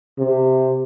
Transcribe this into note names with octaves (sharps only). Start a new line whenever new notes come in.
C3